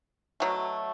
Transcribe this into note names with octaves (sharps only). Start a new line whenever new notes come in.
B2 F#3 A3